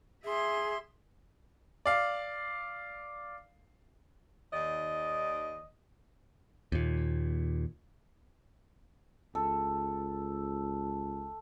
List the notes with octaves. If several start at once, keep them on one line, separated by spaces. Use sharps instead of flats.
G#4 E5 C6
D5 F5
D#2 D#3 D5 D#5
D#2 A#2
C#2 A4